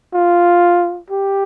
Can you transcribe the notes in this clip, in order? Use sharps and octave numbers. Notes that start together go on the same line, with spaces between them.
F4
G4